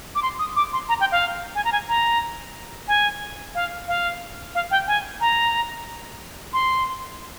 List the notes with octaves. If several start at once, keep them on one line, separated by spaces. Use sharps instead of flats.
D6
C6
D#6
D6
C6
A#5
G5
F5
G#5
A#5
G#5
A#5
G#5
F5
F5
F5
G5
G#5
A#5
C6